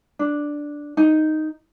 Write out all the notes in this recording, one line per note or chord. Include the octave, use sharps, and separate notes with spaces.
D4
D#4